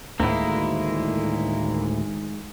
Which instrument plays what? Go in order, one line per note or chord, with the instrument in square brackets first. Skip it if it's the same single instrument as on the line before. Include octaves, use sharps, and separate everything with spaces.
[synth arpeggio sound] D2 A2 [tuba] D#3 [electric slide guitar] G#3 [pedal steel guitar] A#3 E4